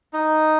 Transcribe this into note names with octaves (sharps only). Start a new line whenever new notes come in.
D#4